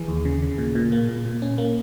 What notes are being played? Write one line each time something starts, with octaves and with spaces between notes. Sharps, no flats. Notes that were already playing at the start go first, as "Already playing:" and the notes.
Already playing: E3 G#4
D#2
C#3
C#3
A#2
A#2
A#3
A#2
A#2
C#4
A#3